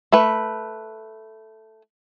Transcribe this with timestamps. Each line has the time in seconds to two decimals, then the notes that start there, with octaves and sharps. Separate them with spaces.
0.13 A3 B4